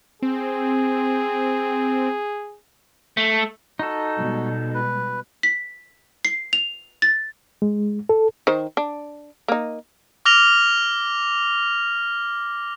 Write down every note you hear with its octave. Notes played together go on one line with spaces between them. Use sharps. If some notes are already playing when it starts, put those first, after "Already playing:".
C4 G#4
A3
D#4 F#4 A4
B2 G3 G#3
B4
B6
C7
F7
A6
G#3
A4
D#3 C5
D4
A#3 D#4
D6 F6 A#6 F7 G7